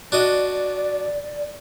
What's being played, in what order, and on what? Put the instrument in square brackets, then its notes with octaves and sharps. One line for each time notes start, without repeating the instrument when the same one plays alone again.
[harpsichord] D4 F#4 D#5 [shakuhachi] D5